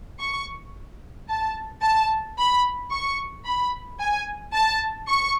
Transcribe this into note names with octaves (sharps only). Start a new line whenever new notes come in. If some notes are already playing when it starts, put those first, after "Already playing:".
C#6
A5
A5
B5
C#6
B5
G#5
A5
C#6